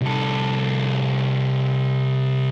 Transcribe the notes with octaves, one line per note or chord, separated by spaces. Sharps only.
C2 A4